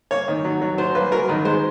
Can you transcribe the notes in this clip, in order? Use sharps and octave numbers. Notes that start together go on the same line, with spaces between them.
A#3 C#5
D#3
F#3
F#3
F#3 C5
A#3 B4
F#3 A#4
D#3 B4
G#3 C5